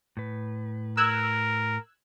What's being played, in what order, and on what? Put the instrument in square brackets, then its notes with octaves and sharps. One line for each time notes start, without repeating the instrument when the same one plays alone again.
[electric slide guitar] A2 B4
[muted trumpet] A#4 [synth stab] E6 F#6 G#6